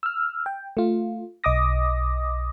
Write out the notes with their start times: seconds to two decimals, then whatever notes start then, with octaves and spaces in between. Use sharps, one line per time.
0.03 E6 F6
0.46 G5
0.77 A3 F4
1.44 B1 D#5 D6 D#6 A#6